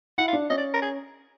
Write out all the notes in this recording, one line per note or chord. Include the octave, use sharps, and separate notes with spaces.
E4 F#5
F5
D4
C#4 D#5
D5
A#4
G#4